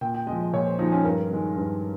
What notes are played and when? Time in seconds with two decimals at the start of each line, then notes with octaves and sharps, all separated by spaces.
0.01 A#2 G5
0.14 G5
0.27 G#3 D#5
0.32 F3
0.40 D#5
0.53 A#2 C#5
0.66 C5
0.79 F3 G#3 D#4
0.92 C#4
1.04 G2 A#4
1.31 D#3 G#3
1.57 G2